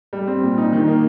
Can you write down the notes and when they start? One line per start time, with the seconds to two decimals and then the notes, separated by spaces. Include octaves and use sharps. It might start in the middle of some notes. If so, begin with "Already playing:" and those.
0.13 G3
0.27 C4
0.42 A#2
0.58 D#4
0.73 D#3
0.87 A#3